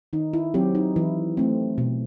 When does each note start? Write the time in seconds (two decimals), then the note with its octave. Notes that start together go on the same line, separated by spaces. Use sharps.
0.13 D#3 D#4
0.34 E4
0.54 F#3 C4 G4
0.75 D#4
0.96 E3 E4
1.37 A3 C4
1.78 B2